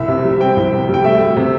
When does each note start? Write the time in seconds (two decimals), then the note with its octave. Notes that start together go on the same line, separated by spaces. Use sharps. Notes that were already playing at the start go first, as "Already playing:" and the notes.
Already playing: C2 E5
0.08 C3
0.25 G3
0.40 C4 G5
0.57 C2
0.73 C3
0.89 G3 G5
1.04 A3 E5
1.20 D2
1.36 C3